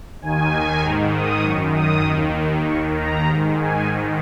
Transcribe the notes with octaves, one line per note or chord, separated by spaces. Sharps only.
D#2 D#3 G#5
G#2 D#3 A#5
D#6
F#2 D#3 C#6
D#6
D#2 D#3
D#2 D#3 C#6
A#5
G#2 D#3
G#5
G#2 D#3